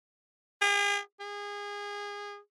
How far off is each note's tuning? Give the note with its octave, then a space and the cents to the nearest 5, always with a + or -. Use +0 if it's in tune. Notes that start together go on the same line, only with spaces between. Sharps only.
G#4 -40
G#4 -25